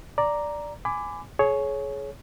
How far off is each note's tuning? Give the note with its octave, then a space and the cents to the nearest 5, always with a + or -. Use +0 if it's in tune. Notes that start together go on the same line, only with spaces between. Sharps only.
D5 +0 A#5 +0 D6 +0
G#5 +0 B5 +30 D6 +0
G#4 +30 C#5 +0